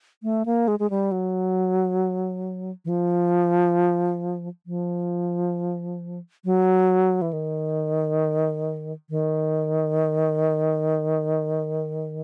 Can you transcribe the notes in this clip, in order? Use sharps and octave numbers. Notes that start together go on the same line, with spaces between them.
A3
A#3
G#3
G#3
G3
F#3
E3
F3
F3
F#3
E3
D#3
D#3